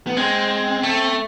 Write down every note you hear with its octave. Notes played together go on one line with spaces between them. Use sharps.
B3
G#3 C4
A3